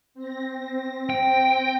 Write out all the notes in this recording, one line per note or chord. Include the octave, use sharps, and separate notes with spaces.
C4 A#6
G5